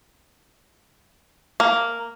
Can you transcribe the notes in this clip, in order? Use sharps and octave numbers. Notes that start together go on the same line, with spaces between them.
A#3